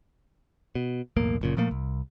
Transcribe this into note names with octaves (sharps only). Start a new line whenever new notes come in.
B2
B1 E2 A2 A#3
F#1 A#2 C#3
A#2 F3 A3 A#3
C2